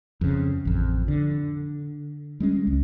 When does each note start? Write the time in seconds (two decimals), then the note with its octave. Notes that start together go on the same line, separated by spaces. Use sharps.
0.21 F2 C#3
0.65 A1 F2
1.08 D3
2.40 G3 G#3 C#4
2.67 C#2